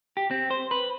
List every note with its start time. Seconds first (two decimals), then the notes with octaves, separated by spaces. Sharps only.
0.17 G4
0.31 C4
0.51 C5
0.71 B4